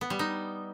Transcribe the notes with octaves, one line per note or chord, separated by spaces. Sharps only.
B3
G3
D#4